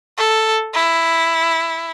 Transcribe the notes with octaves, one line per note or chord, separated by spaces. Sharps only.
A4
E4